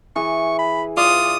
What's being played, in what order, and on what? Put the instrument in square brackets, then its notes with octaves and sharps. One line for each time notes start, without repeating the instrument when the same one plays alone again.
[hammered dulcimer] E3 G#4 [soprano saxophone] C#6
[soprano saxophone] B5
[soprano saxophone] F4 [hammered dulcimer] D5 [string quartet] D#6